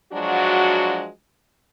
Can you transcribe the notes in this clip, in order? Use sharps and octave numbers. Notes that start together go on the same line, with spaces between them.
F3 F#3 G#3 D4 F#4